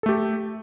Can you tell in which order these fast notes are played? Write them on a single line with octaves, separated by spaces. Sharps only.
A4 A3 G4